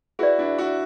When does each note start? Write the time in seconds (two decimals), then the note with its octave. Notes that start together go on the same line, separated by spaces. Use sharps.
0.19 E4 F#4 G#4 B4 D5
0.39 D4 E4
0.58 E4 F#4